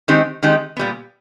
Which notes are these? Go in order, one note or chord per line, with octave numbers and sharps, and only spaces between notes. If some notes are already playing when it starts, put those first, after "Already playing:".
D#3 G#3 C4 D#4 G4
D#3 G#3 C4 D#4 G4
A#2 G3 B3